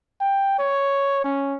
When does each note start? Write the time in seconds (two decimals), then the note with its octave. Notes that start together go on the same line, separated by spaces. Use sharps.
0.21 G5
0.59 C#5
1.24 C#4